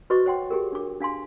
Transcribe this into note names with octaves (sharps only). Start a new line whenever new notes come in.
F#4 B4 C5 D#5 C#6 D6
C5 C#5 F#5 G5 C6
G4 G#4 A#4
D4 D6
D4 F5 G#5 C6